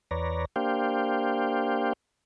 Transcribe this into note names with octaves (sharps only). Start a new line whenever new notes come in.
E2 B4 C#5 D5 A#5
A#3 D4 G4 C5 F5 G5